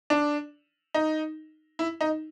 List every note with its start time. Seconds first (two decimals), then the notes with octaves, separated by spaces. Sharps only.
0.10 D4
0.94 D#4
1.79 E4
2.01 D#4